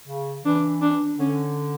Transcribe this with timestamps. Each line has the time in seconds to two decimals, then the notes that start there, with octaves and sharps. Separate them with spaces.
0.08 C#3
0.45 E3 D4
0.82 D4
1.19 D3 C#4